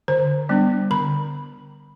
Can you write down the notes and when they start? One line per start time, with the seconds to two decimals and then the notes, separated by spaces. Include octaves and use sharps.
0.08 D3 C5
0.49 G3 B3 D4
0.91 D3 B5